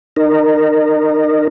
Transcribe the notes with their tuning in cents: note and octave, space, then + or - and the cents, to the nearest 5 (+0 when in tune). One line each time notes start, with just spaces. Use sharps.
D#4 -30 A#4 -10